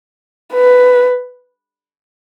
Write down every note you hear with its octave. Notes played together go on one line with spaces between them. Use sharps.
B4